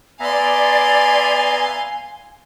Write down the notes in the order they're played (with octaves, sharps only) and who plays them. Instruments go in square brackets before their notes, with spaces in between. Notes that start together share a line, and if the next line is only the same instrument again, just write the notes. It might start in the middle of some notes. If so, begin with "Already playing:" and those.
[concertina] B3 E5 A#5 [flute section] D5 [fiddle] F5 C6 [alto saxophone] G#5